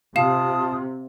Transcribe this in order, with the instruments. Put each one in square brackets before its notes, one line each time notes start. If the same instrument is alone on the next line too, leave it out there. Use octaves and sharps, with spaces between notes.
[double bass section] C3 [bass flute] F4 [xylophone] F5 E7 [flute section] A5 D#6